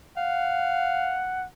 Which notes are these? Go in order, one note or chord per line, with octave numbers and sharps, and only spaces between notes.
F5 F#5